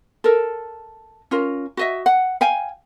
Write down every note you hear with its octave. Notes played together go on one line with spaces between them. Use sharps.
A4 A#4
C#4 F4 A#4
F#4 D#5 E5
F#5
F5 G5 G#5